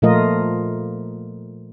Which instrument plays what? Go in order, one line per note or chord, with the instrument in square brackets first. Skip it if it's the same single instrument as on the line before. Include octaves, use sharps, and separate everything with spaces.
[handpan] A#2 F3 A3 F4 A#4 D#5